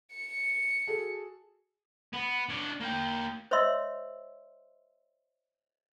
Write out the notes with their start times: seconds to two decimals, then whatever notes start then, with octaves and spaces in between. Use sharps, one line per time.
0.15 C#7
0.87 F#4 G#4 A4
2.13 B3
2.49 D4 C#5
2.80 A#3 G5
3.51 C5 C#5 D#5 E5 C6 E6